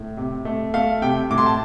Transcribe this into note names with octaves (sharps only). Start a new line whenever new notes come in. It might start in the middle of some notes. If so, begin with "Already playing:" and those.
Already playing: A2
C3
A3
A3 F5
C3 G5
A2 D6
C6
A5